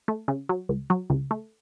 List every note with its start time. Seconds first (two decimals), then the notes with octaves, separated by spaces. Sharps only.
0.08 A3
0.28 C#3
0.49 F#3
0.69 C#2
0.90 F#3
1.10 C#2
1.31 A3